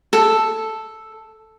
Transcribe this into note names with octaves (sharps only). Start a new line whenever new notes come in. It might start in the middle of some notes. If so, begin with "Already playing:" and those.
A4